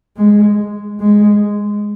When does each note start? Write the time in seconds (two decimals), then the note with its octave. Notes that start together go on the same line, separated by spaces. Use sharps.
0.17 G#3
1.00 G#3